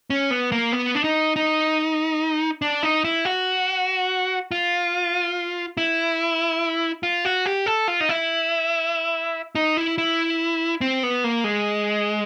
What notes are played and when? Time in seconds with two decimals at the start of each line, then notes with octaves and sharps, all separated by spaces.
0.10 C#4
0.31 B3
0.52 A#3
0.72 B3
0.95 D4
1.04 D#4
1.36 D#4
2.62 D4
2.83 D#4
3.04 E4
3.25 F#4
4.51 F4
5.77 E4
7.03 F4
7.25 F#4
7.46 G4
7.66 A4
7.88 F4
8.01 D#4
8.09 E4
9.55 D#4
9.77 E4
9.98 E4
10.81 C4
11.03 B3
11.24 A#3
11.44 G#3